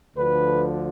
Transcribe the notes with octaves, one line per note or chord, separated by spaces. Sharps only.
D2 D3 F3 B4